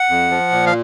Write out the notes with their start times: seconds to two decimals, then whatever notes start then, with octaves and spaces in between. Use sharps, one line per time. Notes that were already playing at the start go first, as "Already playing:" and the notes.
Already playing: F#5
0.09 F2
0.30 F3
0.52 A#2
0.67 F5